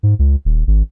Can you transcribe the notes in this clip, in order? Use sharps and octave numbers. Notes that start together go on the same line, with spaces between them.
G#2
C#2
D#1
G#1